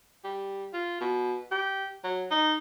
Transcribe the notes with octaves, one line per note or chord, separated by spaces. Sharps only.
G3
F4
B2
G4
F#3
D#4